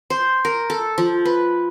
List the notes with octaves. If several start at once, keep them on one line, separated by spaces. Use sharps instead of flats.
C5
A#4
A4
F3
B4